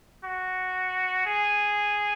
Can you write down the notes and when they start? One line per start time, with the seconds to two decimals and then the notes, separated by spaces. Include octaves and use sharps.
0.24 F#4
1.26 G#4